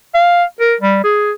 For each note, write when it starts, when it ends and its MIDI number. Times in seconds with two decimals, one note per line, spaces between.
0.15 0.43 77
0.60 0.75 70
0.81 1.00 55
1.04 1.32 68